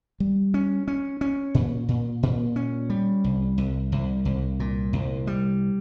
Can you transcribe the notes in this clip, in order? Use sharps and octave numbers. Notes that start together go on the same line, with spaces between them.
G3
C#4
C#4
C#4
A#2
A#2
A#2
C#4
G3
C2
C2
C2
C2
A#2
C2
G3